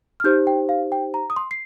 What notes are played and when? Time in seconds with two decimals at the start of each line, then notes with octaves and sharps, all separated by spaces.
0.20 F6
0.24 D#4 G4 C5 G6
0.47 G5
0.69 F5
0.92 G5
1.14 A#5
1.30 D#6
1.36 C6
1.51 C7